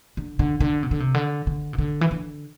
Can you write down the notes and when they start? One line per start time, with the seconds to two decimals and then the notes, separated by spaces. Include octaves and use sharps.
0.17 D3
0.39 D3
0.60 D3
0.83 C3
0.91 D3
1.00 C3
1.14 D3
1.47 D3
1.73 C3
1.78 D3
2.01 E3
2.11 D3